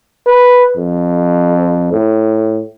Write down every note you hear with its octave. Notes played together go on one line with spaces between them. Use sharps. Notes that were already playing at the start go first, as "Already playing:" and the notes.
B4
F2
A2